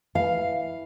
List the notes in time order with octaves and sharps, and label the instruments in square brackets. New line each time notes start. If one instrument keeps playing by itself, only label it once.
[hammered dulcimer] E3 [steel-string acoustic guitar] F5